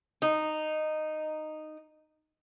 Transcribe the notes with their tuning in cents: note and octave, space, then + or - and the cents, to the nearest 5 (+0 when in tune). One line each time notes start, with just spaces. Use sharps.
D#4 -10